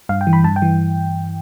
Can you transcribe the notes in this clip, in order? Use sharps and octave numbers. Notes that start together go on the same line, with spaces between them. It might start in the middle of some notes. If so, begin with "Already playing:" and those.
G2 F5
G5
E3
B5
G2 A5
G5
E3